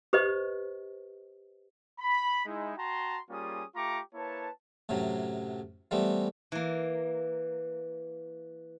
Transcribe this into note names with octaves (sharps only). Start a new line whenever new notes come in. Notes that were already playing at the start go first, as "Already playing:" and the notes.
G4 B4 C5 D#5
B5
G#3 D#4 E4
F#4 G5 A5 A#5 C6
G3 A#3 C#4 F4 G#4 D#6
A3 F4 G4 A#5 C#6 D6
A#3 E4 B4 C#5 A5
F#2 A2 C3 F#3
E3 G3 A3 B3 C4
E3 A#3